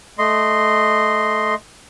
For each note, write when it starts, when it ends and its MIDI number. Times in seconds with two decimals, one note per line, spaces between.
0.18 1.54 57
0.18 1.54 75
0.18 1.54 84